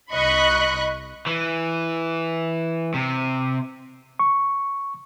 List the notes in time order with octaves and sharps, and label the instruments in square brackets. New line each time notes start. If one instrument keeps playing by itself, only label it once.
[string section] C2 D#5 B5 C#6 F#6
[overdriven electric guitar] E3
C3
[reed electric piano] C#6